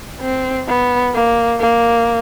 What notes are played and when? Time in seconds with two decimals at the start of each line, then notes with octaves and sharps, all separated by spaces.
0.21 C4
0.68 B3
1.15 A#3
1.60 A#3